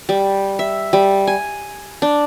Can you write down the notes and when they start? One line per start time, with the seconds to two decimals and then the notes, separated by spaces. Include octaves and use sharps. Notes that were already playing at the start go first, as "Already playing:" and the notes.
0.09 G3
0.59 E5
0.93 G3
1.27 G#5
2.02 D4